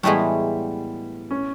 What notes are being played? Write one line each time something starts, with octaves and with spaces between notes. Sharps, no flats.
A2 E3 G3 G#3 B3
C#4